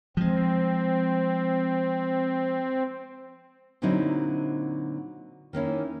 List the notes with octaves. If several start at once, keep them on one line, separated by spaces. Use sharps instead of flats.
F3 G#3 C4
A#2 D3 F#3 C4 D#4 E4
D#3 A#3 C#4 E4